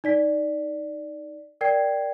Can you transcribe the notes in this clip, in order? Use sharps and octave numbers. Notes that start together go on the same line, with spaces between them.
D#4 D5 B6
A#4 D5 G5 G#6 C7